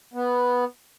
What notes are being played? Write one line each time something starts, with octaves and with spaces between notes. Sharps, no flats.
B3